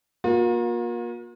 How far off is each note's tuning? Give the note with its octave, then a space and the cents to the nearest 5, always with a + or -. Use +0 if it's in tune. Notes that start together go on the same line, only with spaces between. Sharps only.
A#3 +30 F4 +45